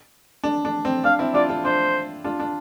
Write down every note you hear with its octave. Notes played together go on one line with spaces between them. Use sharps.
D4
D4
C4
D4 F5
C4 E4
D4 F4 D5
D4 F4
D4 C5
D4 F4
D4